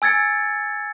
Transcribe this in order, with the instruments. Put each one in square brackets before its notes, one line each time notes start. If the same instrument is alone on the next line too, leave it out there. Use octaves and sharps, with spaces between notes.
[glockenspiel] G#5 E6 G#6 A6 C#7